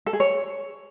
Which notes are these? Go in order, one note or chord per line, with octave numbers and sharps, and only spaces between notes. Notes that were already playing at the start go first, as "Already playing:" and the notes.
A4
G#4
C#5